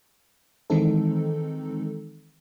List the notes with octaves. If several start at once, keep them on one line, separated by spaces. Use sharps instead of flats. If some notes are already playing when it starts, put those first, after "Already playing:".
D#3 E3 G#3 C4 D#4 A4